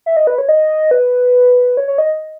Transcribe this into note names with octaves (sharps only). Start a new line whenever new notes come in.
E5
D#5
B4
C#5
D#5
B4
C#5
C#5
D#5